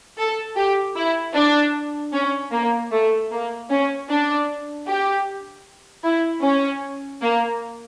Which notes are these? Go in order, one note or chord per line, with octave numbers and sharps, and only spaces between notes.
A4
G4
E4
D4
C#4
A#3
A3
A#3
C#4
D4
G4
E4
C#4
A#3